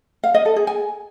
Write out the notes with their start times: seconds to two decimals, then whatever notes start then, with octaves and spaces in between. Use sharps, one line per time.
0.24 F5
0.34 D#5
0.45 A4
0.56 G#4
0.67 G#5